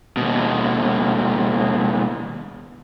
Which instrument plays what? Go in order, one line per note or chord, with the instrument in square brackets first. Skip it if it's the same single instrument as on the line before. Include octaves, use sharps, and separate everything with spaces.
[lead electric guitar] D#2 B2